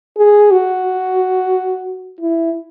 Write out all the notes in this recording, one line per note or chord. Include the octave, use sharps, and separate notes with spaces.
G#4
F#4
E4